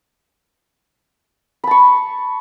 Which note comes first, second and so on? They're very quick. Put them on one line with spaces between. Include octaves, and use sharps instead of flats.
B5 A5 C#6